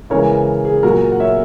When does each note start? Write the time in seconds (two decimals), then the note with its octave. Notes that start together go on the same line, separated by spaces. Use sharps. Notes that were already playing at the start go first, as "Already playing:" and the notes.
0.10 C#3 E3 G#3 A#4 C#5
0.65 G#4
0.83 A#2 F#3 F#4 A#4
1.12 F#5
1.20 C#5 E5